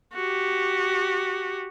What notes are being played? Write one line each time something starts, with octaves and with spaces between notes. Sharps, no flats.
F#4 G4